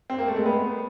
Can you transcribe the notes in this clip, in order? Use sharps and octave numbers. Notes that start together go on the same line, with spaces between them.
C4
A#3
A3
G#3
B3